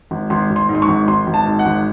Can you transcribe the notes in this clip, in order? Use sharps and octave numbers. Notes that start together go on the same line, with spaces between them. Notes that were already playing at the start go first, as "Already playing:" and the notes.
G#1
G#1 C6
G#1
C6
G#2
C6
C#6
G#1
G#1 C6
G#1
A5
G#2
F#5
G#1